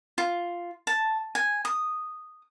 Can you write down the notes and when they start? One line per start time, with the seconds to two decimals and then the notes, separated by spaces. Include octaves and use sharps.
0.18 F4
0.87 A5
1.35 G#5
1.65 D#6